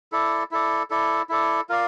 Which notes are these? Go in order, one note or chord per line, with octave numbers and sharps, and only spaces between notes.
E4 A4 D5
E4 A4 D5
E4 A4 D5
E4 A4 D5
F4 A#4 D5 F5